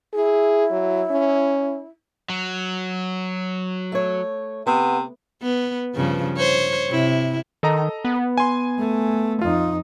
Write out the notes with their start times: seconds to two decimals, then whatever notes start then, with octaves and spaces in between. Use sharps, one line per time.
0.14 E4 G#4
0.71 F#3
1.10 C#4
2.29 F#3
3.92 A3 C#5
4.67 C3 B3
5.42 B3
5.95 G2 C#3 F3
6.37 C5 C#5
6.89 C3 E4
7.63 D#3 A4 D#5 A#5
8.05 B3
8.38 G#5 C6
8.79 A3
9.41 F2 D#4 F4